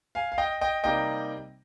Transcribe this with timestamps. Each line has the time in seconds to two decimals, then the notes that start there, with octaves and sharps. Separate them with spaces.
0.15 F5 G#5
0.32 F5
0.38 D#5 G5
0.61 D#5 G5
0.84 C3 G3 A#3 D#4 D#5 G5